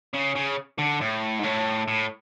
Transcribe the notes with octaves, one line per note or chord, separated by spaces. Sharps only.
C#3
C#3
D3
A2
G#2
A2
A2